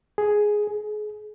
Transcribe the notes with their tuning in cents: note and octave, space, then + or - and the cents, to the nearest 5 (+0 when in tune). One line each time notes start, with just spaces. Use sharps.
G#4 +5
G#4 +30